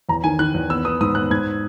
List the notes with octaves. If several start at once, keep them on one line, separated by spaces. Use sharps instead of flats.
E2 A#5
D#3 G#5
D#3 F#6
E2
B3 E6
B3 D#6
G#2 D#6
B3 F#6
G#2 G#6